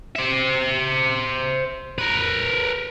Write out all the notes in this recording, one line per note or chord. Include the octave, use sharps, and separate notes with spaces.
C5 E5
A#4 B4